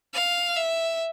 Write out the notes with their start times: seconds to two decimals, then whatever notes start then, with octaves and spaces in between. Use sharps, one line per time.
0.14 F5
0.56 E5